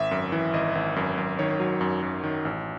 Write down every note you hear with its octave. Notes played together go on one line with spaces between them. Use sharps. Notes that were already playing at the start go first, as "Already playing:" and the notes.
Already playing: G#1 E5
F#2
E3
G#1 D#5
G#1
F#2
F#2
D#3 C#5
F#3
F#2
F#2
D#3
A1